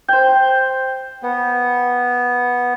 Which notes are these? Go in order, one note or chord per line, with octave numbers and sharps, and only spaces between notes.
C5 G5
B3